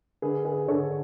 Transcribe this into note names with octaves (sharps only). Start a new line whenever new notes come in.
D3 G#4 B4
G#4 B4
D3 A4 C#5